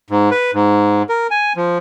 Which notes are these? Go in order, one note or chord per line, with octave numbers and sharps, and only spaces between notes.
G#2
B4
G#2
A#4
G#5
F3